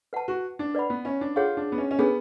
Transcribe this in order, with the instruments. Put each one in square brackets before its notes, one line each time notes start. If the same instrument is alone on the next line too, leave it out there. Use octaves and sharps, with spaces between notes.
[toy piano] B4 F#5 A5
[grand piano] F#4
D4
[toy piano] B4 D5 F#5 B5
[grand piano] B3
C#4
D4
[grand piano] F4 [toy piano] G#4 C#5 F#5
[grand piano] D4
B3
C#4
C#4
[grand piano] B3 [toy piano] D4 G#4 B4